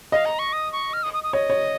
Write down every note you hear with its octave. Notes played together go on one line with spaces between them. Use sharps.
D#5 F5
A#5
C#6
D#6
C#6
F6
D#6
D#6
D#6
C#5 D#5
C#5